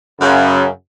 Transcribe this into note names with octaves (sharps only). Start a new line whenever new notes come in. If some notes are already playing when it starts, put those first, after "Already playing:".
F#2 C#3